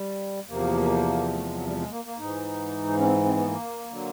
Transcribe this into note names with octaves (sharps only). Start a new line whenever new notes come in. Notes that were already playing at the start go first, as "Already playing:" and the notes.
Already playing: G3
E2 C3 F3 A#3
A3
G#3
F#3
G3
G#3
A#3
A#3
G#2 D#4
E3
C#4
C4
C4
B3
A#3
D3 F#3